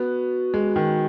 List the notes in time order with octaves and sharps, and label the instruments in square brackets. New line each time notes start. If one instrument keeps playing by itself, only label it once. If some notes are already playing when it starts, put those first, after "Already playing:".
Already playing: [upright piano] B3 [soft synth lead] F#4
[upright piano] G#3
D#3